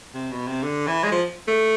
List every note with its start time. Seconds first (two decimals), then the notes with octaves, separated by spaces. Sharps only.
0.14 C3
0.31 B2
0.47 C3
0.63 D3
0.87 E3
1.04 G#3
1.11 F3
1.48 A3